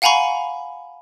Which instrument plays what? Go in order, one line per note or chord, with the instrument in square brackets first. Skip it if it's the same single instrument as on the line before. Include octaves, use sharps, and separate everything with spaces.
[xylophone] F5 F#5 G#5 A#5 B5 C#6